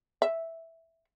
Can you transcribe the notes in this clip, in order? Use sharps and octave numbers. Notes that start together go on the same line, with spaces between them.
E5